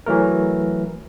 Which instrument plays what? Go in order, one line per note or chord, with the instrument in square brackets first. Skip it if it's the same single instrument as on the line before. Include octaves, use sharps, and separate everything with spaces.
[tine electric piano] E3 F#3 A3 A#4